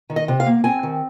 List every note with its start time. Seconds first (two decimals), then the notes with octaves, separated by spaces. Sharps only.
0.10 D#3
0.16 D#5
0.28 C3
0.40 F5
0.46 A#3
0.64 C4 G#5
0.83 D#3